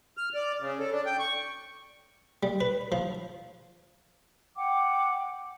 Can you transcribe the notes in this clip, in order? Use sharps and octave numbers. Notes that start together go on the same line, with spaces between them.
F6
D5
C#3
A4
D4
G5
C#6
G3
B4
F3
F#5 G5 D6